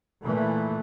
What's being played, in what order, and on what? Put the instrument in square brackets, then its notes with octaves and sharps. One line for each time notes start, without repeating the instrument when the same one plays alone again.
[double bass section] A#2 E3 A3